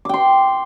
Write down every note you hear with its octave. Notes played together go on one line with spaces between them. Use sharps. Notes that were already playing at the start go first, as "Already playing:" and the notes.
G5 C6 D6